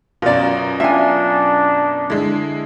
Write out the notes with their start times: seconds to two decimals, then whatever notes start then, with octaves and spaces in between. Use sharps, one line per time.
0.22 F#2 B2 F4 D5
0.80 D4 F4 E5 G#5
2.10 D3 G#3 E4